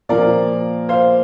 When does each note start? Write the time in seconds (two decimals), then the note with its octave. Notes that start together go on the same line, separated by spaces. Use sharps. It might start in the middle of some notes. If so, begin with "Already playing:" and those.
0.09 A#2 F3 A#3 A#4 D5
0.89 C5 F5